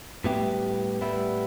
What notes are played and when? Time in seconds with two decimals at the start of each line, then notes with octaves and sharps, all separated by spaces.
0.24 A2 G3 B3 E4 G4
1.01 A2 G3 B3 E4